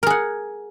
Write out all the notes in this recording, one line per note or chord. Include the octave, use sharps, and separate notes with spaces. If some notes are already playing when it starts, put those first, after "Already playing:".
G#4 A#4 F#5